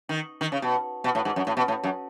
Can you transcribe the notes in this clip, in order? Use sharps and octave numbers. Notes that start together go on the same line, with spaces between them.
D#3
D#3
C#3
B2
B2
A2
G#2
F#2
A2
B2
A2
F#2